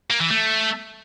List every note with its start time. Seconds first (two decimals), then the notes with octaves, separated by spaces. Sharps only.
0.10 A#3
0.20 E3
0.30 A3